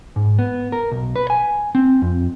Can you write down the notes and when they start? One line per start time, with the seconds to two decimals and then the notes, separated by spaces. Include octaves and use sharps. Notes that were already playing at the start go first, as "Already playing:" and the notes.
0.16 G#2
0.39 B3
0.72 A#4
0.91 B1
1.16 B4
1.30 G#5
1.75 C4
2.02 F2